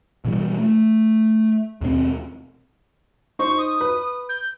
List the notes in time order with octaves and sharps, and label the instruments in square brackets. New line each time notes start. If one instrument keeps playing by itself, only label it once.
[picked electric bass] B2 E3 G3
A3
D#2 B2 G#3 C4
[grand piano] D#4 C5 [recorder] C#6
[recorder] D#6
[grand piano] B4
[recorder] G6